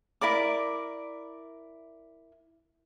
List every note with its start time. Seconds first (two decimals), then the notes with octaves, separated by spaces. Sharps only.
0.21 E4 A#4 D5 D6